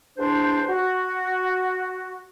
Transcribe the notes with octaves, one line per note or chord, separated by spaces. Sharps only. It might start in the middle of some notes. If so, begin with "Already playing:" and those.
E2 D4 C5
F#4